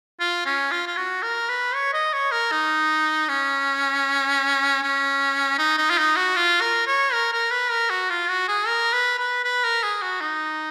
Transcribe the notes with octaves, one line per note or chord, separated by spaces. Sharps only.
F4
C#4
F4
F4
F#4
A#4
B4
C#5
D#5
C#5
A#4
D#4
C#4
C#4
D#4
D#4
F4
D#4
F#4
F4
A#4
C#5
A#4
A#4
B4
A#4
F#4
F4
F#4
G#4
A#4
B4
B4
B4
A#4
G#4
F#4
D#4